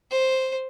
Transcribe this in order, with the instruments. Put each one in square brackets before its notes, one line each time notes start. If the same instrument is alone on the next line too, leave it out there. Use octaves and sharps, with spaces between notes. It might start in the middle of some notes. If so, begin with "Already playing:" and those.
[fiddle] C5